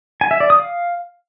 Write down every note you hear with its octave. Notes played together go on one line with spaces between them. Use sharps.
G#5
E5
D5
D#6
F5